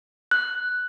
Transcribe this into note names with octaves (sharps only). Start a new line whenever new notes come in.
F#6